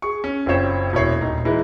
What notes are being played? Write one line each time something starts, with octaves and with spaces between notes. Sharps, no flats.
G#4 C#6
C#4
F#1 C4 F4 C5 C#5 E7
E1 E4 C#5 C7
D#1 D#4
E3 G#3 D#4 E4